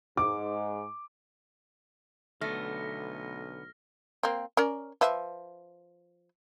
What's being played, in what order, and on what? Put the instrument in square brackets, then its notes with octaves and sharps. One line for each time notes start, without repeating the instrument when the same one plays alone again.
[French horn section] G#2 [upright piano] D6
[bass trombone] B1 [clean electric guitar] D3 B3 [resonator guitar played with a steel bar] A3 [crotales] F6 A#6
[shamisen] A#3 C4
C#4 A#4 D5
F3 B4 E5